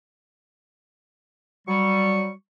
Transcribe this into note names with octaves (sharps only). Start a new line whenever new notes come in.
F#3 G3 C#6